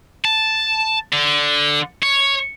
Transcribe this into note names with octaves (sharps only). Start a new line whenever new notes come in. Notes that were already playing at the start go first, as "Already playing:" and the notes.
A5
D3
C#5